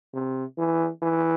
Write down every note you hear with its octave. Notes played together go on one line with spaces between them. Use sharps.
C3
E3
E3